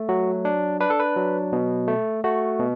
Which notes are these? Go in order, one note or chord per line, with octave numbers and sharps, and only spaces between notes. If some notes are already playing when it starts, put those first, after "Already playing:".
Already playing: A3
F#3 F#4
D4
D4 B4
A4
B4
F#3
B2
A3
A3 F#4
B2